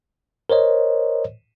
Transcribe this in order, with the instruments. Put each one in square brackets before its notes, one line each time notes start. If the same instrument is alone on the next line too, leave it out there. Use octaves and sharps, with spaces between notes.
[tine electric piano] A#4 C5 C#5 D#5